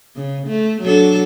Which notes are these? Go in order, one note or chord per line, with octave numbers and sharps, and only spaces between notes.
C#3
A3
F#3 D4 A4